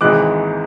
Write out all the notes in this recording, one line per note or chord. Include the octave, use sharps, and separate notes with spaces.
G#1 G#2 E3 G#3 D6 F#6